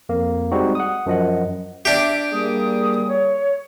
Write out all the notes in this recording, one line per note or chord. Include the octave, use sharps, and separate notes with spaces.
F2 A#3
G3 G#3 C4 D#4 F#4
F#5 D#6
F#2 F3 D#5 F#5
D4 G4 E5
G3 A#3 G#4 D#6
C#5